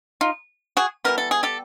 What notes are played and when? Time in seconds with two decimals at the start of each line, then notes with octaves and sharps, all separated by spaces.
0.21 D#4 F4
0.77 F#4 G#4
1.04 E3 G3 B3 A#4
1.18 A4
1.31 G#4
1.43 G4 A4